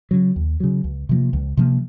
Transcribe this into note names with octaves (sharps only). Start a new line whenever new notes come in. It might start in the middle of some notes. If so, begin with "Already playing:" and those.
C#3 F#3
D#2
C#3 F#3
C#2
C3 F3 A#3
C#2
C3 F3 A#3